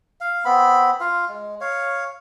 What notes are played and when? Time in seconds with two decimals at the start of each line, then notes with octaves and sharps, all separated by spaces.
0.21 F5
0.45 B3 C4 B5
1.00 F4 F5
1.28 G#3
1.61 C#5 F5